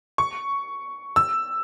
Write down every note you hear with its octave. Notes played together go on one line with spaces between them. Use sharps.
C#6
E6